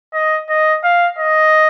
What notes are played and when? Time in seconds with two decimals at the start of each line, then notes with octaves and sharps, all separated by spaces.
0.13 D#5
0.49 D#5
0.83 F5
1.18 D#5